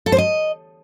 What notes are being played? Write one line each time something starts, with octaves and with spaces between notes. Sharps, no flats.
A4
C5
D#5